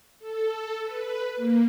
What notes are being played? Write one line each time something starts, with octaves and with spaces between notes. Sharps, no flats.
A4
B4
A#3